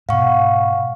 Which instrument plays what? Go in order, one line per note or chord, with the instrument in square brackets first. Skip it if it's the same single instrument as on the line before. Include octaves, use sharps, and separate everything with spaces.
[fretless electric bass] G#2 B2 [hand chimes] F5 F#5 C#6